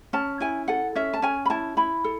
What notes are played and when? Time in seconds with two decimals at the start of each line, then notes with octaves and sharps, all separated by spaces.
0.13 C#4 A5
0.40 E4 G#5
0.68 A4 F#5
0.95 C#4 E5
1.13 A5
1.22 C#4 G#5
1.45 B5
1.50 E4 A5
1.77 E4 B5
2.04 A4